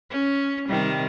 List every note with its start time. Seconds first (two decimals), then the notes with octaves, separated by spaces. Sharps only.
0.10 C#4
0.69 C3 D#3 G3